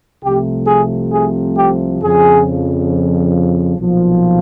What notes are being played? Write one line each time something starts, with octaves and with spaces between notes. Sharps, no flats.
C2 C3 F3 A3 G4
G#4
G#4
G4
F2 C#3 F3 G#4
B1 A#2 F3